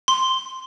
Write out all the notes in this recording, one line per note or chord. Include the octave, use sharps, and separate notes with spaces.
C6